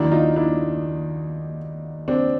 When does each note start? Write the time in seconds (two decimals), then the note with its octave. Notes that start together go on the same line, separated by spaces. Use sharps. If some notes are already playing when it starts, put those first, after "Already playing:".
Already playing: D#2 D#3 F#3 D4 E4
0.11 D#4 F4
0.36 D4 E4
2.08 C4 D4